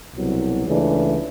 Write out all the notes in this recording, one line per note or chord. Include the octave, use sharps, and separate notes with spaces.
C2 B2 F#3
C#2 C#3 E3 A3 D4